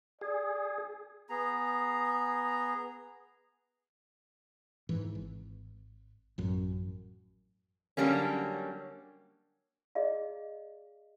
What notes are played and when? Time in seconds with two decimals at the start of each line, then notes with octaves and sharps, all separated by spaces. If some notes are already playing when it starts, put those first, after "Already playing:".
0.21 G#4 D5
1.30 B3 G#4 A#5
4.89 G#2 E3
5.15 G#1
6.38 A1 F#2
7.97 D3 F#3 G3 A#3 C#4
9.95 G#4 D5 D#5 F5